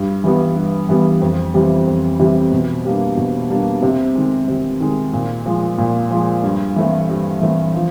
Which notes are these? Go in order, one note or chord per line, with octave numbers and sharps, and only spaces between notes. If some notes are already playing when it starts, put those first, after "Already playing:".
Already playing: G2
E3 G3 B3
G2
E3 G3 B3
F2
C3 E3 G3
F2
C3 E3 G3
B2
G3 A#3 D4
B2
G3 A#3 D4
C3
D#3 G#3
C3
D#3 G#3
A#2
F3 G#3
A#2
F3 G#3
G2
E3 A3 C4
G2
E3 A3 C4
F3